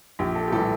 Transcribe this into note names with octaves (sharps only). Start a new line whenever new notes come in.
A#1 G4
A4
G4
A2 E3 G3 A4